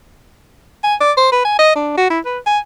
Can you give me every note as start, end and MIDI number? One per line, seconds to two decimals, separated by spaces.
0.84 0.95 80
1.01 1.12 74
1.17 1.30 72
1.32 1.45 71
1.45 1.54 80
1.59 1.74 75
1.75 1.97 62
1.97 2.07 66
2.10 2.20 64
2.26 2.38 71
2.46 2.59 80